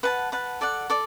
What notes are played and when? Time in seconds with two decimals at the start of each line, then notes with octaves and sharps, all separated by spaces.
0.03 B4 F#5 A5
0.32 B4 F#5 A5
0.61 A4 D5 F#5
0.90 A4 D5